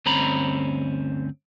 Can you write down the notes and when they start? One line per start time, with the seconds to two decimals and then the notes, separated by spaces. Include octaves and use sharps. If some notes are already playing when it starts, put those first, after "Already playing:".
0.06 D2 G2 C4 C#4 A#5 B5